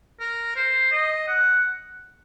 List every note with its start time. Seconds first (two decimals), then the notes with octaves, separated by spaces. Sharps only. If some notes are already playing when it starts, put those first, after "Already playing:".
0.20 A#4
0.56 C5
0.92 D#5
1.28 F#5